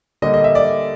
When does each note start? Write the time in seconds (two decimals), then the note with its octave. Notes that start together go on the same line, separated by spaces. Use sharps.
0.22 D3 G3 A#3 D#5
0.34 D#5
0.44 E5
0.55 D5